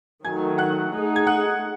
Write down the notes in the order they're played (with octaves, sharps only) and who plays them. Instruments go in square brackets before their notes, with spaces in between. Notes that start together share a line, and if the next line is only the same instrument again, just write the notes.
[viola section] D#3 F#3 A3 [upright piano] G#5 G#6
[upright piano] F#5 F#6
[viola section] A3 D#4 G#4
[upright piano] G#6
F#5 F#6